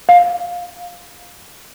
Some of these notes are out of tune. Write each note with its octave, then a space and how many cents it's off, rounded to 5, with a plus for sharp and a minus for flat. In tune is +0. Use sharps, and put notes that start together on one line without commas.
F5 +10